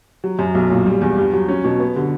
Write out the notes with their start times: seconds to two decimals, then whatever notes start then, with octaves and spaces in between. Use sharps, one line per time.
0.24 F#3
0.39 F#2
0.55 B1
0.70 A#2
0.86 G3
1.01 E2
1.17 G2
1.33 F#3
1.48 C#4
1.64 B2
1.80 B3
1.96 D3